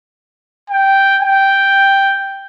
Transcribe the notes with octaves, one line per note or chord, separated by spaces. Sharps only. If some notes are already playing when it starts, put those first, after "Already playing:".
G5
G5